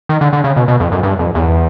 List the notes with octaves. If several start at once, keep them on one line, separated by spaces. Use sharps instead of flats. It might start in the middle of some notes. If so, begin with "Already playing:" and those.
D#3
D3
D3
C#3
B2
B2
F2
F#2
G2
F2
E2